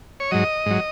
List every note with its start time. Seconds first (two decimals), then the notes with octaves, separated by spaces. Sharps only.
0.20 C#5
0.31 G#2 F#3 D#5
0.66 G#2 F#3